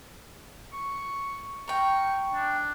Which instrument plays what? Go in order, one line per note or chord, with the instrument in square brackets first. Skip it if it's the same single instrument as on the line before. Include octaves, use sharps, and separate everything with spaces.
[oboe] C#6
[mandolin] A#4 G5 [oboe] C#6
[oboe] D4